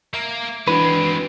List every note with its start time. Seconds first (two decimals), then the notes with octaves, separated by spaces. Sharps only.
0.14 A#3 E5 A#5
0.68 E3 G#3 C4 D4 F#4 B4